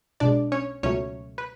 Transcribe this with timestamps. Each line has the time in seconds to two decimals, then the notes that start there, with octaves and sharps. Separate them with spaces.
0.20 B1 B2 G#3 D4 D5
0.52 C#4 C#5
0.83 C#2 B2 F#3 A3 C#4 C#5
1.38 B4